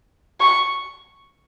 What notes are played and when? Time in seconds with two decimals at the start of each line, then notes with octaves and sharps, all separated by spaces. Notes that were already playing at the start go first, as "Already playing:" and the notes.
0.40 C#6